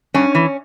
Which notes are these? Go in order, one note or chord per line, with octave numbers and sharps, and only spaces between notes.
G2 C#4
E3